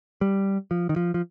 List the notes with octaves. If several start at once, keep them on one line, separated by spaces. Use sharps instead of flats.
G3
F3
D#3
F3
F3